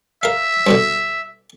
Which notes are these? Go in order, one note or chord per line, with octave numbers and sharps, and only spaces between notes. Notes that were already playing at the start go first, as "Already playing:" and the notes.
A#4 E5 F5
G2 B2 D3